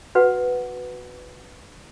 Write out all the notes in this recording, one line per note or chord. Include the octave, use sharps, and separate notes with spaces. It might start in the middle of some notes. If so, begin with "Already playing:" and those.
F#4 B4 F#5